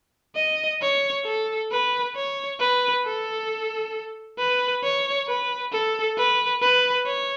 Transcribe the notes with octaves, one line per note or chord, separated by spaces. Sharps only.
D#5
C#5
A4
B4
C#5
B4
A4
B4
C#5
B4
A4
B4
B4
C#5